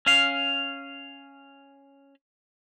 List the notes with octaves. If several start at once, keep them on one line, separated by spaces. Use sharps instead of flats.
C#4 F5